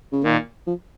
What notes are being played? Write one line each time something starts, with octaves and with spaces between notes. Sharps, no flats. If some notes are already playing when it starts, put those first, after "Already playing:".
C#3
A#2 D#3
F3